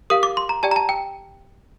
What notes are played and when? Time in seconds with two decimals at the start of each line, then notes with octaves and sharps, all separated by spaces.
0.10 G4 A#4 F5 D#6
0.23 D6
0.37 C6
0.49 A#5
0.63 G4 D5 G5 A5
0.71 A#5
0.76 A5
0.89 G5